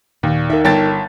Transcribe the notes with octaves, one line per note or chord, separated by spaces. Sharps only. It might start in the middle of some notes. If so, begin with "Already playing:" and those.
D#2 A#2
D#4 A#4 E5
G1 C#5 G5 A5 A6